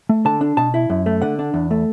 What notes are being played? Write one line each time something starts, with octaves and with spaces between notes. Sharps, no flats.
A3
D3 A5
D4
B2 A5
E4
F#2
A3
D3 F#5
D4
E2
A3